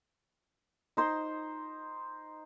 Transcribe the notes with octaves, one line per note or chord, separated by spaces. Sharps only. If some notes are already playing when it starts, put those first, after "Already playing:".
D#4 C5 C6